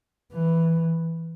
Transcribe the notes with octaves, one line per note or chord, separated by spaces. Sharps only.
E3